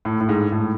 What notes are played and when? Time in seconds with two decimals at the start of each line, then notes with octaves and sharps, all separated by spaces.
0.05 A2
0.21 A2
0.29 G#2
0.52 A2